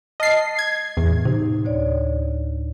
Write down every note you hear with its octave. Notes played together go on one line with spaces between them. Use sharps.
D#5 A5 F6 A6 C7
G#6
E2 A2
C3 D#4
D2 C#5 D5